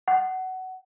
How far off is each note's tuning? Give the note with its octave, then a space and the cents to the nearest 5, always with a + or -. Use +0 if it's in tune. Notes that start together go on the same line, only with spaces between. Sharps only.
F#5 +20